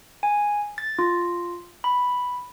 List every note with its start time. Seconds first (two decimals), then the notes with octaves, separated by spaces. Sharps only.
0.23 G#5
0.78 A6
0.99 F4
1.84 B5